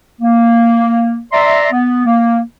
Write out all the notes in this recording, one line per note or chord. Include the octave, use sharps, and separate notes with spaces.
A#3
D5 E5 A#5 C6
B3
A#3